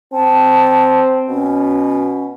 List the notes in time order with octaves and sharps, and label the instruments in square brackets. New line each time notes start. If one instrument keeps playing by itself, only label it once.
[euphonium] C4 [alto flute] A5
[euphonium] B2 [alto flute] C#4